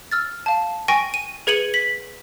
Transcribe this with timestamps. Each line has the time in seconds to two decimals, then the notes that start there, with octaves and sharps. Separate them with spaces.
0.11 E6 F6 A6
0.46 F5 A5
0.88 G5 G#5 C#6 A#6 D7 D#7
1.14 D#7
1.47 G#4 B4 G#6 C#7 D#7 F#7
1.74 B6 F#7